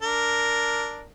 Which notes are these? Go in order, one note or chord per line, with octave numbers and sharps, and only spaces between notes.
D4 A#4